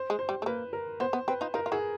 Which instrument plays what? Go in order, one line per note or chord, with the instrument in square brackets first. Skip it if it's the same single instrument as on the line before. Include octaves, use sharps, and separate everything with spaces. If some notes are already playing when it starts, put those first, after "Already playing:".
Already playing: [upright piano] C5
[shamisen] G#3
[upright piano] C5
[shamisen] G3
A3
[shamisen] A#3 [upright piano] B4
[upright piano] A#4
[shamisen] B3 [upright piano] C5
[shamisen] B3
[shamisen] C4 [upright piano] B4
[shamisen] D#4 F4
[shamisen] D#4 F4 [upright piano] A#4
[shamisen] F4
[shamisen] E4 F#4 [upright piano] G#4